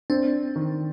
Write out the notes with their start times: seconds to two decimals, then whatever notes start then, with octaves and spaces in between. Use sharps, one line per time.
0.10 C4 D4
0.56 D#3